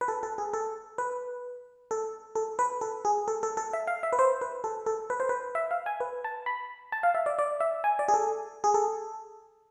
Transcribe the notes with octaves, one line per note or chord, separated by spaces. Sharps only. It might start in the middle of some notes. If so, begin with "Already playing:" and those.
B4
A4
A4
G#4
A4
B4
A4
A4
B4
A4
G#4
A4
A4
A4
E5
F5
E5
B4
C5
B4
A4
A4
B4
C5
B4
E5
F5
G#5
B4
A5
B5
A5
F5
E5
D5
D5
E5
G#5
D5
G#4
A4
G#4
A4